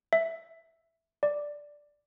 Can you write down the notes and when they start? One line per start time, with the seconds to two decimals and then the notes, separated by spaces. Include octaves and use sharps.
0.13 E5
1.23 D5